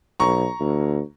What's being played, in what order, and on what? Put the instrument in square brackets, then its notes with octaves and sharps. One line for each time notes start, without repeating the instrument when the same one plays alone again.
[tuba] B1 [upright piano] A#5 C#6
[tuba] D2